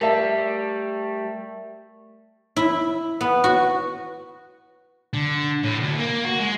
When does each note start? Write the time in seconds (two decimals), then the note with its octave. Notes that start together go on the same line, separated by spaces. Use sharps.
0.01 G3 A3 A#4 D5 E5 A5 C7
2.56 E4
3.21 B3
3.44 F#4
5.14 D3
5.64 A2
5.81 D2
5.99 A#3
6.24 F#4
6.39 G#3